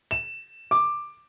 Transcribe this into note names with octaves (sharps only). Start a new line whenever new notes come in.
E7
D6